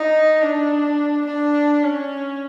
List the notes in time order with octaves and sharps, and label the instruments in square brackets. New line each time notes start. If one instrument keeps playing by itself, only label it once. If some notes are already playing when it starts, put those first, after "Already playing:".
Already playing: [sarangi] D#4
D4
D4
C#4